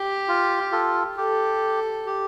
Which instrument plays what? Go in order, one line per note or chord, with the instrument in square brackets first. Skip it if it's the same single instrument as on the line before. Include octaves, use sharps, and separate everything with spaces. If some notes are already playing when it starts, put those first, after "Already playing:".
Already playing: [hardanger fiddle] G4
[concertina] F4
F4 A4
[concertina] G4 [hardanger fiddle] A4
[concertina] G4